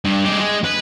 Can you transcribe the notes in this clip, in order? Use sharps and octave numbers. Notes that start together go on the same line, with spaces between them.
G2
G#3 G4
G#3
B4